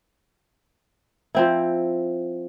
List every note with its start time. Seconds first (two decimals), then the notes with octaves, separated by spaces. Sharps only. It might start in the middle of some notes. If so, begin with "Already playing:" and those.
1.35 F3 C4 E4